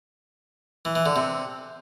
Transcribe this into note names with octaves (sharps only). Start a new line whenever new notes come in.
E3
E3
D3
C3